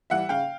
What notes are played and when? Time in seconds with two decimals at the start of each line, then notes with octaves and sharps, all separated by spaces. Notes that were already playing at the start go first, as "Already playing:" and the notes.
0.10 E3 G3 E5 F#5
0.29 C#3 F5 G5